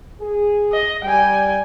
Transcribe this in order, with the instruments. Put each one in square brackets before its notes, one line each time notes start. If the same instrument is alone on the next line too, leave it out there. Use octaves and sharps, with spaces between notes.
[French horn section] G#4
[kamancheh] D#5
[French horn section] G3 [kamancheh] G5 G#5